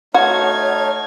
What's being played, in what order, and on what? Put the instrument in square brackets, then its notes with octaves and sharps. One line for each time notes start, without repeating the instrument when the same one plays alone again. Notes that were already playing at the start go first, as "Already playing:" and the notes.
[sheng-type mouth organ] A3 D#4 F6 [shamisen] F#4 [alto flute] C#5 [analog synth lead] G#6